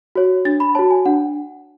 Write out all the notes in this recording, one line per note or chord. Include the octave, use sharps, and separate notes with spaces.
F#4 C#5
D4 A6
B5
F#4 C#5 A5
G#5
D4 F#5